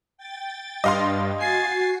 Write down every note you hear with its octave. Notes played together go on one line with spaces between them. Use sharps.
G5 A6
G2 D#5 F5 C6
F#4 G#5 A6 C7